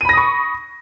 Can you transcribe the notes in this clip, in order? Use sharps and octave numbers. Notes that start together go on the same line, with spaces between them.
B5 C#6 D#6 A#6 D#7